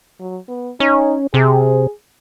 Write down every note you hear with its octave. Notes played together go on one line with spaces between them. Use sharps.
F#3
B3
C#4 D#4
C3 G#4